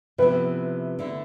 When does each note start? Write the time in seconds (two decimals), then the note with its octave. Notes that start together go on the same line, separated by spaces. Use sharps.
0.18 C3 F3 B3 E4 B4
0.99 D3 A3 E4